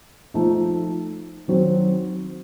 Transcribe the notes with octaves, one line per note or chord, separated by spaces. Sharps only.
F3 A3 D#4
D#3 F#3 C4